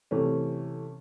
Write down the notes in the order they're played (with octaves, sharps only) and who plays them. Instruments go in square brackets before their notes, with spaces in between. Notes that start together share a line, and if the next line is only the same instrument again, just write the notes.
[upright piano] C3 E3 A3 C#4